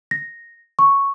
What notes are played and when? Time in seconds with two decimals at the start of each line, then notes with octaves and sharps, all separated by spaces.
0.11 A#6
0.79 C#6